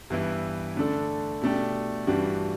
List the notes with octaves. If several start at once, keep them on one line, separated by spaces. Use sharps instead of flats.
G2 E3 B3 E4
D3 A3 D4 A4
B2 A3 D4 G4
G2 E3 G3 D4 F#4